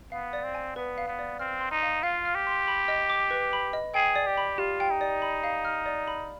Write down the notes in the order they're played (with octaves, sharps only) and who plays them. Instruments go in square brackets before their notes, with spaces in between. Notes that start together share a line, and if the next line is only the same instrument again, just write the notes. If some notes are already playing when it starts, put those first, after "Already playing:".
[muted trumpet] B3 [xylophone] F5
[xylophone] D5
[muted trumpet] C4
[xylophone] G#5
[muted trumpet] B3 [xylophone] B4
[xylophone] F5
[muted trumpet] B3
[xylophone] D5
[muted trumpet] C4 [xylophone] F6
[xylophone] C6
[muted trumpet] D#4
[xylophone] F5
[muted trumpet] F4 [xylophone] F5
[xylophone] F6
[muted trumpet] G4
[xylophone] C6
B5
D#5
D6
B4
B5
D#5
[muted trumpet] G#4 [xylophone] G5
[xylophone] D5
[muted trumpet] G4
[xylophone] B5
[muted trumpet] F4 [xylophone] G4
[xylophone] G5
[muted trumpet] D#4
[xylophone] D5
B5
F5
F6
D5
B5